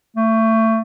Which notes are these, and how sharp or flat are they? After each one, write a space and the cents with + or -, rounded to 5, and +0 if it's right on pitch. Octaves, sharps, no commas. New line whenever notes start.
A3 +25